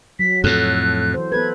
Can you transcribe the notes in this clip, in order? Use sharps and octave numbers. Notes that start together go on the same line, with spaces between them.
F#3 B6
F2 A2 A4 F#6
E3 C5
B3 A4 B4 G#6